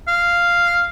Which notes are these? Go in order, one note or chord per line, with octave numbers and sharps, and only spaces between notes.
F5